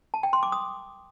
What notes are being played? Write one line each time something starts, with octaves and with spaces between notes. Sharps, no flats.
A5
G5
C6
D6
D#6